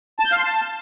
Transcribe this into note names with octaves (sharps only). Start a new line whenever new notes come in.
A5
G6
F5
C6
A5